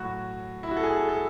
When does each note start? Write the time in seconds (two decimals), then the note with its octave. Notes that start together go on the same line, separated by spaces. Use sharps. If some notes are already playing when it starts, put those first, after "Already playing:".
Already playing: A2 F#3 F#4
0.63 E4
0.71 F#4
0.77 A4
0.83 G#4
0.96 A4
1.09 A4